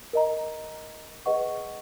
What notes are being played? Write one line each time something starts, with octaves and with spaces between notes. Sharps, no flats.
A#4 D#5 A#5
G#4 B4 D#5 F#5 C#6